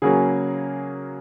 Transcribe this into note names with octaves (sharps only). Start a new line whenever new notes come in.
C#3 F#3 A#3 C#4 G#4